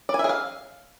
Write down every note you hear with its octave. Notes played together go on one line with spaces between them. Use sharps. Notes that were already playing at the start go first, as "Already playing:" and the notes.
D5
G#5
E5
G#4
F5